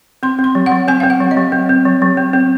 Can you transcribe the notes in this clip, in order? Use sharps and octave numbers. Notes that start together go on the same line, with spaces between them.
C4 C6
C4
C6
F#3
F#5
F#3
C4 G#5
C4 F5
F#5
F#3
D#5
F#3
C4
C4
F#3
F#3
C4
C4